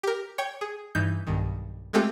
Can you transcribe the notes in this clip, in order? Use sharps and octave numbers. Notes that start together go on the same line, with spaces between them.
G4 A#4
C#5 G5 C#6
G#4
G2 E3 D#4 G6
B1 G2 D#3
G#3 A3 C4 F4 G4 A4